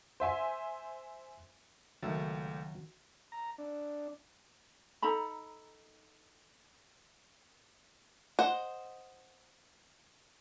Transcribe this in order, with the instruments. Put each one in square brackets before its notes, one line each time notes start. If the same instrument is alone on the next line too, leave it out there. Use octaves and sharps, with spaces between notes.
[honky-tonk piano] C5 E5 G#5 C6
[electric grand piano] C#2 A3 [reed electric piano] D#3 F#4 A6 [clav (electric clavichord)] F#3 E5 F5
[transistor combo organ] A#5
D4
[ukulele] D#4 A4 A#5 B5
[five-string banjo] C5 D#5 F#5